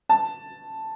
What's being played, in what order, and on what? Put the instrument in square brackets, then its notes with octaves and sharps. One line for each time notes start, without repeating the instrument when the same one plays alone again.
[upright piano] A5